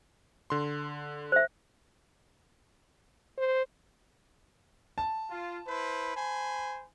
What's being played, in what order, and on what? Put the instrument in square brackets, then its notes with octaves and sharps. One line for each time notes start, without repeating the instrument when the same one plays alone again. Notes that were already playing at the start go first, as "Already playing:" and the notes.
[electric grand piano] D3 C6
[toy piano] C5 E5
[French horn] C5
[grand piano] A5
[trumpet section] F4
E4 B4 C5
C5 G#5 B5